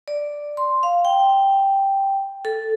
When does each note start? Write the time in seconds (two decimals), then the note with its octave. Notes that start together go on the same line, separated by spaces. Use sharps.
0.08 D5
0.57 C6
0.83 F5
1.05 G5
2.45 A4